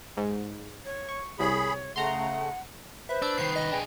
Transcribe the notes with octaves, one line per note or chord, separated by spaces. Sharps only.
G#2
C#5
C#6
C2 G#4 C#5 B5
C#3 A3 F#5 A#5 C6
B4 C5 E5
D4 E6
C2 D#3 C7
D#5
D4 G#4 G5